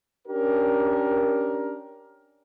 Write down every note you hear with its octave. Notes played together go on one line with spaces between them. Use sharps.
C#4 D4 G4 A#4